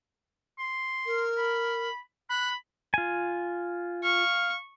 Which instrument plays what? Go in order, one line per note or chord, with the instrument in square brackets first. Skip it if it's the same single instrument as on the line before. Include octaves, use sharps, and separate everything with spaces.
[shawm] C6
[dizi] A#4
[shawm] B5
[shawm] B5 [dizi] F#6
[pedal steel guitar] F4 G#5
[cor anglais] F5 [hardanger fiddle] C#6